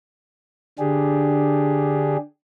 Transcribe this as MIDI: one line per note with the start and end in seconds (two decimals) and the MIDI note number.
0.79 2.17 50
0.79 2.17 62
0.79 2.17 67
0.79 2.17 68